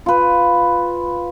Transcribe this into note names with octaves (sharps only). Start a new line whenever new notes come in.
F4 B4